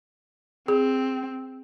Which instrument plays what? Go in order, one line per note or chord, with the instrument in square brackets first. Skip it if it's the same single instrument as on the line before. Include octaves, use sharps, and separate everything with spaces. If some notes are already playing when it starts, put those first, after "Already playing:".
[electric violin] C4 [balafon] G#4